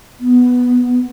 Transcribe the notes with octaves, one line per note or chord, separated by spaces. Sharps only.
B3